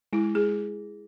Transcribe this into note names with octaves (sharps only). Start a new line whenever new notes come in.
G#3 E4
G#3 G#4